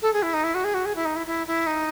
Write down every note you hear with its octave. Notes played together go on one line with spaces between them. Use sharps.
A4
G#4
E4
D#4
E4
F#4
G#4
F#4
G#4
E4
D#4
E4
E4
E4
D#4